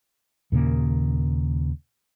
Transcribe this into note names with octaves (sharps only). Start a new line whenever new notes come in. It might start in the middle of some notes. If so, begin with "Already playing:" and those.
D#2 A#2 C#3 A#3